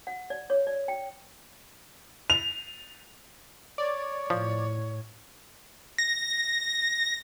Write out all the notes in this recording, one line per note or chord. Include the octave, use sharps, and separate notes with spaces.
F#5
D5
C#5
D5
G5
F7
C#5 D5
A2 F3
A#6